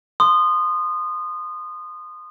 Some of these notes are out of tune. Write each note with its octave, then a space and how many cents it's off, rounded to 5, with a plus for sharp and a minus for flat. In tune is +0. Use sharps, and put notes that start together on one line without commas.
C6 +0 D#6 -25